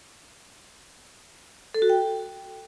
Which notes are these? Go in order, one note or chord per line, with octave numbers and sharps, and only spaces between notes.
A4
F#4
G5